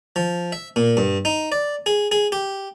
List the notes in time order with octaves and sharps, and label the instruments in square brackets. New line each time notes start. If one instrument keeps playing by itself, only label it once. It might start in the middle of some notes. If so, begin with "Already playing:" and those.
[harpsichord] F3
E5
A#2
G2
D#4
D5
G#4
G#4
G4